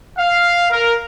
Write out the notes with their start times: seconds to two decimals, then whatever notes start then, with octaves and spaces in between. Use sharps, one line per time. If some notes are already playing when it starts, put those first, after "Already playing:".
0.17 F5
0.71 A#4